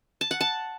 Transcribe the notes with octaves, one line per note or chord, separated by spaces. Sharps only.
A5
F#5
A5